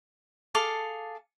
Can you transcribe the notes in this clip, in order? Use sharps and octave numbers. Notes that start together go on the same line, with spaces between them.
G#4 A4 F5 D6